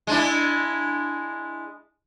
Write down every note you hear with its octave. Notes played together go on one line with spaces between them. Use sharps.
G#3 D4 E4